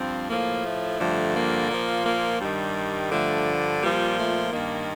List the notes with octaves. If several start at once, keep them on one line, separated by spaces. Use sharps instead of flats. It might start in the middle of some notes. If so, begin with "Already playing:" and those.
Already playing: G2 F3 C4
A2 F3 A#3
A3
G2 D3 F3
A#3
A#2 F3
A#3
G2 D#3 G3
G2 D3 F3 A3
A#2 F3 G3
A3
G2 D#3 A#3